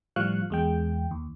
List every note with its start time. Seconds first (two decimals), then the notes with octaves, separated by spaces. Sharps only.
0.16 A2 F3 G3 F5 C#6 F#6
0.50 E2 G#3 G5
1.11 D#2